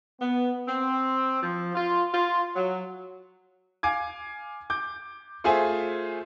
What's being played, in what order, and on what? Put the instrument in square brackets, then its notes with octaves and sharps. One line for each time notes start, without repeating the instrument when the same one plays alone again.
[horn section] B3
C4
F3
F4
F4
F#3
[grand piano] F5 G#5 D6 G#6
D6 G6
A3 F4 G#4 C5 E5 G#5